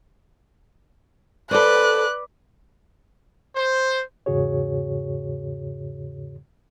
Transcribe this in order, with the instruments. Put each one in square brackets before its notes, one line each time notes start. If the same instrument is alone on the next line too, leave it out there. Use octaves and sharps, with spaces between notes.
[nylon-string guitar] A4 C5 [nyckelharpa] B4 D5 [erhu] F#6
[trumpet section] C5
[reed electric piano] E2 G#2 C#3 F#4 G#4 C#5